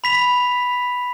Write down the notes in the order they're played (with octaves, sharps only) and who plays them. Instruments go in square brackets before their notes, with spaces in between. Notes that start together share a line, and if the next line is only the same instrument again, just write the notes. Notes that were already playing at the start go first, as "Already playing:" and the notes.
[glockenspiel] B5 B6 F7